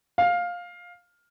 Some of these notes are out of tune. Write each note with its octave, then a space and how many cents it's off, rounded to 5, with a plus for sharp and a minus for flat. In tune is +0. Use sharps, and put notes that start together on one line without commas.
F5 +10